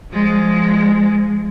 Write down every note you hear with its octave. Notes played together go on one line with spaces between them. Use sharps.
F3 G#3